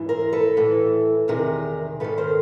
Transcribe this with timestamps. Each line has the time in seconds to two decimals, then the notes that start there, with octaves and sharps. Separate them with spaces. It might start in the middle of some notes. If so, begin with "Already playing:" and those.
Already playing: G#2 E3
0.09 A#4 C5
0.33 A4 B4
0.57 A2 E3
1.28 E2 C3 D#3 G#4 A#4
2.00 G#2 D#3 A4 B4
2.18 A#4 C5